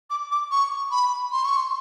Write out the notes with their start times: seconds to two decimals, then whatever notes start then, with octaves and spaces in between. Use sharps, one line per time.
0.10 D6
0.31 D6
0.51 C#6
0.91 B5
1.32 C6
1.45 C#6
1.56 C6